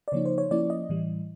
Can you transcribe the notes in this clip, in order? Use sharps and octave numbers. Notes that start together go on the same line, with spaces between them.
D5
C#3 F3 A#3 D#4 C#5
C5
C#5
F3 A#3 C#4 E4 D5
D#5
A2 E3 G3